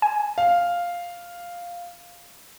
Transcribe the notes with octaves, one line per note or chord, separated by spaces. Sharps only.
G#5
F5